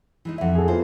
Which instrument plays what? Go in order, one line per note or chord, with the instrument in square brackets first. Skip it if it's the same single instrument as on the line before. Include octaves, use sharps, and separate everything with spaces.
[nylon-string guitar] E3 G#3 D#4
[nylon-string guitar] F2 E4 [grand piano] E5 F#5
[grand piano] G#4 A4
[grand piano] B3 F4 [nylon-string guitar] C5